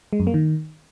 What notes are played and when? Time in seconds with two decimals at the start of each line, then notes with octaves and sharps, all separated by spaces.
0.13 G#3
0.20 F#2
0.27 A#3
0.34 D#3